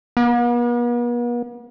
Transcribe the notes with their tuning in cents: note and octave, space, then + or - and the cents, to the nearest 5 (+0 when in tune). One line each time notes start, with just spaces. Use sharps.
B3 -45